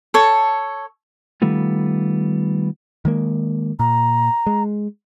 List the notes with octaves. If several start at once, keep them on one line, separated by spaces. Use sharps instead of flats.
A4 C#5
D#3 G3 A3 B3 F4
D#3 G#3 A#3
A#2 A#5
G#3